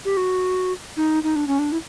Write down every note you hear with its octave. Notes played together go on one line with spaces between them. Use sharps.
G4
F#4
D#4
D#4
D4
C#4
D4
E4